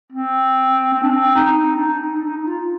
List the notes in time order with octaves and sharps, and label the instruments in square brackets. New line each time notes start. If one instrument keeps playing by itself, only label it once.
[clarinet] C4
C4
D4
C4
D#4
D4
D4
D#4
D4
D#4
D#4
F4